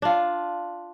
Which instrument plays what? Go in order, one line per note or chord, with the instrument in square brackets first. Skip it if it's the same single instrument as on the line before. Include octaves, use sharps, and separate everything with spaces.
[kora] D4 F4